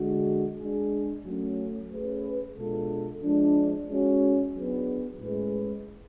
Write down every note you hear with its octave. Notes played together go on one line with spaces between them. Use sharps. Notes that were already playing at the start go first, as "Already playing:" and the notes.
Already playing: D3 G#3 D4 F#4
G#3 D4 G#4
F#3 A3 C#4
A3 C#4 G#4 B4
B2 G#3 D4 F4 A4
F3 G#3 D4
G#3 C#4 F#4
F#3 B3 D4 G#4 B4
A2 G#3 C#4 G#4 B4